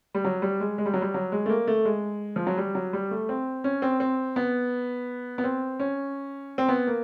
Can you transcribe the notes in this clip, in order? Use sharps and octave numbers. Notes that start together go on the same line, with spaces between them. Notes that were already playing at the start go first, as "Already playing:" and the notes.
G3
F#3
G3
G#3
G#3
G3
F#3
G3
F#3
G#3
A3
A#3
A3
G#3
F3
F#3
G3
F#3
G3
A3
C4
C#4
C4
C4
B3
B3
C4
C#4
C4
B3
A#3